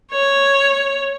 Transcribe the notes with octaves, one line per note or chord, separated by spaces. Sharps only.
C#5